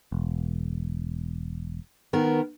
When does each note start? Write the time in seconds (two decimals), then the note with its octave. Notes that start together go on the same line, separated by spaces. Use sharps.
0.12 E1
2.13 D#3 B3 A#4